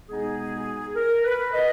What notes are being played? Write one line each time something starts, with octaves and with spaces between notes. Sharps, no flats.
B2 G#3 B3 D#4 G#4
A#4
B4
D#5